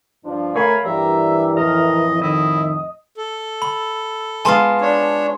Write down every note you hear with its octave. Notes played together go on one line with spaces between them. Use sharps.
G2 F3 D4
A3 A#4 C#5 F5 G#5 B5
G2 E3 G4 A#4 D5 E5
F2 A2 A#4 D#5
D#3 E4 D#5
A4
B5
G#3 B3 F4 G#5 A5 C6
D4 C#5